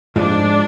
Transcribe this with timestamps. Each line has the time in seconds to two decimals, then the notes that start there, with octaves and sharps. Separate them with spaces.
0.16 G#2 F3 G#3 D4